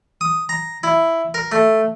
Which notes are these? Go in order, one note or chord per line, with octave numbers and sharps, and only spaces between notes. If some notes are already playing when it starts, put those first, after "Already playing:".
D#6
A#5
E4
A#4
A3